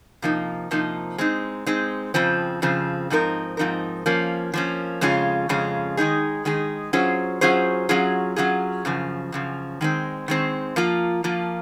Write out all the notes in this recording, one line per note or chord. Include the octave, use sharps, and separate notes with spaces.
C3 F3 A#3 D#4
C3 F3 A#3 D#4
G#3 C4 D#4
G#3 C4 D#4
F2 C#3 F3 C4
F2 C#3 F3 C4
G#2 F3 C4 D#4 A#4
G#2 F3 C4 D#4 A#4
F3 A#3 C#4
F3 A#3 C#4
F2 C#3 G#3 C#4 F4
F2 C#3 G#3 C#4 F4
D#3 G#3 D#4 G#4
D#3 G#3 D#4 G#4
F#3 C#4 F4 G#4 C5
F#3 C#4 F4 G#4 C5
F#3 C#4 F4 G#4
F#3 C#4 F4 G#4
F#2 C#3 F3
F#2 C#3 F3
D#3 G#3 C4
D#3 G#3 C4
F3 A#3 F4
F3 A#3 F4